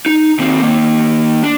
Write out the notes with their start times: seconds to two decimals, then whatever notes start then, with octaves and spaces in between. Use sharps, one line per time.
0.06 D#4
0.39 D#2 C4
0.62 D#3 A#3
1.43 D4